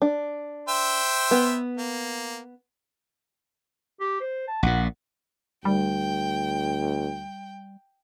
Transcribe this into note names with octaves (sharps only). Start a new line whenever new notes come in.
D4
C5 E5 G5
B3
A#3
G4
C5
A5
A#1 A#2 F#5
D2 G3 G5